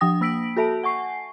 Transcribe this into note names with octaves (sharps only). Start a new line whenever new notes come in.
F3 D4 G5 D#6 A#6
A#3 E6 B6 D7 F#7
F#4 A4 E5 A5 D7
F#5 G#5 C#6 C7